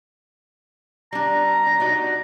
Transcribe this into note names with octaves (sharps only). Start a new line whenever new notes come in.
G3 D4 A#5
D4
D#4 F#4 D5